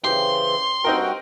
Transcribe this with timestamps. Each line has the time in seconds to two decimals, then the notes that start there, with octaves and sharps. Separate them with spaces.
0.04 C#3 E3 C4 G4 C6
0.84 G2 C4 D#4 F#4 A#4 G5